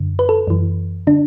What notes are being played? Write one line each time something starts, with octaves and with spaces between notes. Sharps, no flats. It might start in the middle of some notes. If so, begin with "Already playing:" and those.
Already playing: F#2 D3
B4
A4
F#2 E3
D3 D4